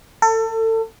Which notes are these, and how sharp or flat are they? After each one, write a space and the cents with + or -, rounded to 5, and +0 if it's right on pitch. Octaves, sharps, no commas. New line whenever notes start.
A4 +30